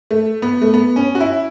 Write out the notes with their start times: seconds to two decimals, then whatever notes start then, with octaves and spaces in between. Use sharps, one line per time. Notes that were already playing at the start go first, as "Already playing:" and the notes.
0.11 A3
0.42 B3
0.62 A3
0.74 B3
0.96 C#4
1.15 F#4
1.20 E4